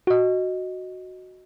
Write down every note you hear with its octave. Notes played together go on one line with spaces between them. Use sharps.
F#4 D#5